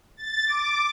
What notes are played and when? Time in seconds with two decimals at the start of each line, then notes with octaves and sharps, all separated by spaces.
0.17 A6
0.47 D6